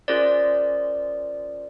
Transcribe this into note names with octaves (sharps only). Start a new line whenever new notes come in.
C#4 F4 G#4 A#4 C5 D5